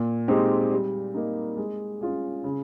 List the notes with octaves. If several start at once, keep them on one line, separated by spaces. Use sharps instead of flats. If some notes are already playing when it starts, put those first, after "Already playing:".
Already playing: A#2
G#3 C4 D#4 G4
G3
A#3 D#4
G#3
C#4 F4 G#4
C#3